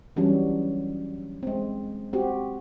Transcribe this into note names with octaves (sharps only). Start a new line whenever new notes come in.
E3 F#3 G3 C#4 D4
G#3 C4
C4 F#4 G4